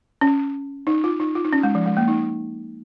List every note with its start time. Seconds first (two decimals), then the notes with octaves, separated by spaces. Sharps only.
0.21 C#4
0.87 D#4
1.04 F4
1.20 D#4
1.35 F4
1.45 D#4
1.53 C#4
1.63 G#3
1.75 F3
1.86 G#3
1.97 A#3
2.08 D#4